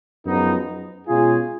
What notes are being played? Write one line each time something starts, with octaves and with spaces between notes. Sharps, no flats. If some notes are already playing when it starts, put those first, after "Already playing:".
F#2 F3 G#3 B3 D#4
B2 G#3 C#4 F4 G#4